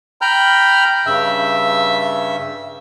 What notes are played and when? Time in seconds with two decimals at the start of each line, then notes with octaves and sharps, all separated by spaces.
0.21 G5 A#5 B5 F6 G6
1.06 G2 C#3 E5 E6